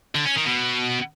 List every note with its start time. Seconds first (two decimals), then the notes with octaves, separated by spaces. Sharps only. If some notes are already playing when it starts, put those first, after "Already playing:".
0.15 D3
0.25 C#4
0.36 D#3
0.46 B2